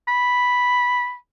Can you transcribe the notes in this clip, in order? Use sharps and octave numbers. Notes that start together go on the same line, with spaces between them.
B5